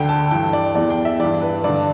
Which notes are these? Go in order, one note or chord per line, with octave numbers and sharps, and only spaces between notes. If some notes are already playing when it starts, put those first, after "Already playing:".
Already playing: D2 D3 G5
A5
G2 E3 G5
D5
E2 E3 D5
G5
E5
G2 E3 D5
B4
G2 D3 D5